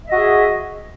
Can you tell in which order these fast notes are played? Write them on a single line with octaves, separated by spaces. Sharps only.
E5 D#5 F#4 G#4